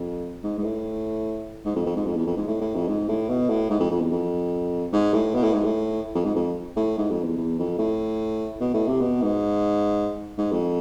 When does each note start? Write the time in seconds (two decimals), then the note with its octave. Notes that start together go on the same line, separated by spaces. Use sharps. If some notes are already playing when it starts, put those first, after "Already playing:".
Already playing: F2
0.43 G#2
0.58 G#2
0.64 A2
1.65 G#2
1.75 F2
1.86 F2
1.96 G#2
2.06 F2
2.16 E2
2.26 F2
2.37 G#2
2.47 A2
2.61 A2
2.75 F2
2.88 G#2
3.08 A2
3.29 B2
3.49 A2
3.70 G#2
3.80 F2
3.91 F2
4.00 E2
4.11 F2
4.93 G#2
5.13 A2
5.34 B2
5.43 A2
5.53 G#2
5.64 A2
6.15 F2
6.25 G#2
6.35 F2
6.76 A2
6.98 G#2
7.10 F2
7.24 E2
7.37 E2
7.59 F2
7.78 A2
8.60 B2
8.74 A2
8.88 C3
9.01 B2
9.22 G#2
10.38 G#2
10.52 F2